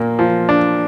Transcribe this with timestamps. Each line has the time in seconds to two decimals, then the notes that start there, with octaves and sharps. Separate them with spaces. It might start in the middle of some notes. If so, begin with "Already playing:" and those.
Already playing: A#2 A#3
0.19 F3
0.49 D4